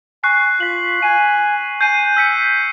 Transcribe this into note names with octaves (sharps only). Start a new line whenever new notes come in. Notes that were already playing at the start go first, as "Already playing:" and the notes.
G#5 C#6 F#6 C7
F4 B6 F#7
G#5 D#7
G#5 G6 C7 D#7
E6 B6 C#7